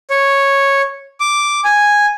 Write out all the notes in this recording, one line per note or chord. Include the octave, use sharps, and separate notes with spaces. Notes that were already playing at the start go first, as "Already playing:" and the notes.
C#5
D6
G#5